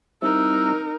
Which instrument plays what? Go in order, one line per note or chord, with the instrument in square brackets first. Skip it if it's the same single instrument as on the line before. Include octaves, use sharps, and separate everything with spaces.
[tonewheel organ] G3 C4 E4 [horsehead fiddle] D#4 A#4 [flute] E6